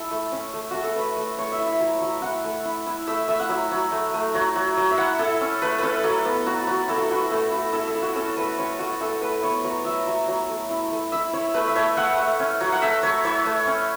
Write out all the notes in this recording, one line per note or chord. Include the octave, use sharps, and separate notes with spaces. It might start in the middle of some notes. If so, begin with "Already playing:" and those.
Already playing: E4 A4 E5
A3
C#4
A3
A3 F#4
A4
A3 B4
A3
A3 C#5
E5
E4
E5
F#3
F#3
E4 F#5
A3
E4
E4
A3 E5
A3 E5
F#5
F#3 E5
F#3
A3
A3
F#3
F#3
F#3
E5
E4 F#5
E4 A4
C#4
A3 B4
C#4 A4 B4
F#3 A4
B3
F#3 F#4
F#3 F#4
E4 A4
F#4
E4 F#4
A3 A4
E4 F#4
E4 A4
A4
E4
F#4
C#4 A4
A3 B4
C#4 C#5
A3 F#4
A3 A4
A3 B4
B3 C#5
F#3 C#5
F#3 E5
F#3
F#3
A3
E4
A3
E4 E5
E4 C#5
A3 B4
E5
A3 C#5
A3 F#5
A3
C#4
F#3
F#5
A3 E5
A3 C#5
E4 C#5
A3
C#4